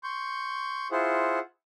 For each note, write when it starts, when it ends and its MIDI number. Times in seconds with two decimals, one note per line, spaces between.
0.03 0.88 84
0.03 0.88 85
0.03 0.88 91
0.91 1.39 64
0.91 1.39 65
0.91 1.39 68
0.91 1.39 72
0.91 1.39 78